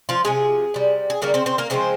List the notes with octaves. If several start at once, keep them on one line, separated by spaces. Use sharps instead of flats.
F3 F4
C3 F3 G#3 G#4
C3 G3
G#4
C#3 G3 A#3 A#4
C4 C5
C4 C5
A#3 A#4
C#3 F3 G#3 C4 C5